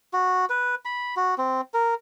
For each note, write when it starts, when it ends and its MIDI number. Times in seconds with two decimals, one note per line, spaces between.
0.13 0.45 66
0.50 0.75 71
0.85 1.15 83
1.17 1.35 66
1.38 1.61 60
1.74 1.94 70